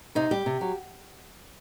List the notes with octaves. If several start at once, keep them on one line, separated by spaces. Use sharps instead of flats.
C3 D#4
G3 G4
C3
F#3